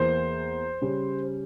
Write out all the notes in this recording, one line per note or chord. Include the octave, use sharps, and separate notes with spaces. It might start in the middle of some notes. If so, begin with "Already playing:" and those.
Already playing: E2 E3 A#3 E4 C5
C#3 G3 C#4